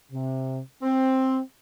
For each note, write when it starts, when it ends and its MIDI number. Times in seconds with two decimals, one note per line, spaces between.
0.11 0.59 48
0.82 1.39 60